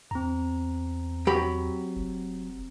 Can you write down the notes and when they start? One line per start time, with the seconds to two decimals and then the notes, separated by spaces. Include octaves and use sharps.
0.11 E2 C4 A#5
1.27 F#3 G4 B5
1.96 F1